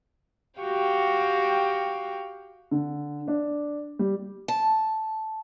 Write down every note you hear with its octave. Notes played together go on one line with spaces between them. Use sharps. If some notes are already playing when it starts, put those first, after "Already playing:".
F#4 G4 F5 G5
D3
D4
G3
A5